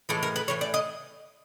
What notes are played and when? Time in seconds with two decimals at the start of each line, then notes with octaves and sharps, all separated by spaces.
0.09 A2 E3 G#3 A4
0.23 A#4
0.36 B4
0.48 A2 E3 C#5
0.61 D5
0.74 D#5